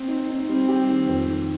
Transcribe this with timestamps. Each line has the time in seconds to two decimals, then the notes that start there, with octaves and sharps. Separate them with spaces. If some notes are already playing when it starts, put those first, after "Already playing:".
Already playing: C4
0.08 D#4
0.28 D#4
0.48 G3 C4
0.68 G4
0.89 D#3
1.08 F2
1.28 D#3